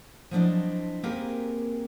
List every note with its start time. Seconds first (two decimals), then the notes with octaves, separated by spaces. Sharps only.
0.31 F3 F#3 C4 D4 E4 D#5
1.03 A#3 C4 G4 G#4 A#4 B4